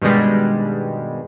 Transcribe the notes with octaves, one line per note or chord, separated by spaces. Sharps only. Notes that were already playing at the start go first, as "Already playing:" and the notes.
G2 B2 D#3 G3 G#3